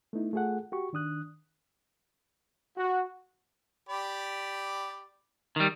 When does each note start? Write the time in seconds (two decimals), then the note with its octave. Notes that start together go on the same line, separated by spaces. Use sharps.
0.13 A3 B3 D#4 E4
0.33 A3 F4 G#4 A4 F#5
0.72 F#4 G4 C#6
0.93 D#3 D4 D#6 F#6
2.77 F#4
3.89 G4 D5 B5
5.56 D#3 G3